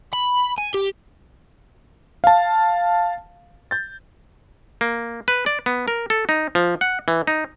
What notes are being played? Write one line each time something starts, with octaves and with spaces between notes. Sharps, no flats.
B5
G#5
G4
F5 A5
G6 A6
A#3
B4
D5
B3
A#4
A4
D#4
F3
F#5
E3
D#4